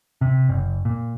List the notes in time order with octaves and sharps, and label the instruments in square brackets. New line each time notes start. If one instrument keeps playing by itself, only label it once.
[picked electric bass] C3
F#1
A#2